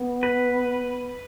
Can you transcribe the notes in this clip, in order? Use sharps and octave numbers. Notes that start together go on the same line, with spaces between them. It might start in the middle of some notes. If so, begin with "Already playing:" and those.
Already playing: B3
B4